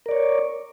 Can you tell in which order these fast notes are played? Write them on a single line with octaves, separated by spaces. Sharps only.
A#4 D5 C#5